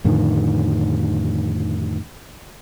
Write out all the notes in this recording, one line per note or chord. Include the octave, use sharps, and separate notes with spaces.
F2 A2 D3 D#3